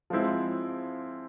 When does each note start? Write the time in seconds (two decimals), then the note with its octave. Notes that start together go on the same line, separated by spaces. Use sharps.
0.10 F3 G#3 C4 E4